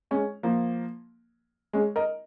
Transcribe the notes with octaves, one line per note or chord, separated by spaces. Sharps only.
G#3 C#4
F3 A#3
G#3 C#4
A#4 D#5